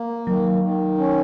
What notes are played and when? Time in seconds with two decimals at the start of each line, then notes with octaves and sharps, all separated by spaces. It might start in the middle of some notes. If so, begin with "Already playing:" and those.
Already playing: A#3
0.27 D#3 F#3
0.63 D#3
0.98 C#4